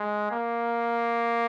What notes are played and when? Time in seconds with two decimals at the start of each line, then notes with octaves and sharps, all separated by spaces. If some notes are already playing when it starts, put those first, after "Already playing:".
Already playing: G#3
0.31 A#3